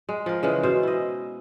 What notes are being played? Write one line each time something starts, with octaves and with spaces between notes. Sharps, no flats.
G#3
F3 A#4
C#3 E3 G#3
B2 C5
E4 D#5